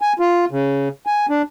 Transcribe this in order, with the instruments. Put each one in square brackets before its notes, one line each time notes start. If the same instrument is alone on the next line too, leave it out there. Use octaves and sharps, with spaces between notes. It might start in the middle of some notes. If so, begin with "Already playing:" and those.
[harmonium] G#5
F4
C#3
G#5
D4